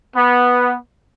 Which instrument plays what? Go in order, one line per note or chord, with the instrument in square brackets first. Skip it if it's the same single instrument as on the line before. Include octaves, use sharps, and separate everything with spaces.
[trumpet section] B3